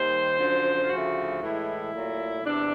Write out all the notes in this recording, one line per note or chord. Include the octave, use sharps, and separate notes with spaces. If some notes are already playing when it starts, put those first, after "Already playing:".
Already playing: D#2 D#3 G3 C5
F#2 D3 F3
F4
D2 C#3 F3 A3 F#4
A2 E3 G#3 E4
A#2 F#3 A3
E2 C3 E3 D4